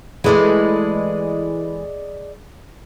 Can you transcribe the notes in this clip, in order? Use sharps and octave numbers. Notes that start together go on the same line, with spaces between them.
E3 G#3 A3 G#4 D5 D#5